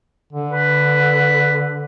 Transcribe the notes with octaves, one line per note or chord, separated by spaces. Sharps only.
D3
B4